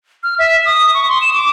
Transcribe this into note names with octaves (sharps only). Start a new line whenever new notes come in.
F6
E5
D#6
C#6
C6
E7
D6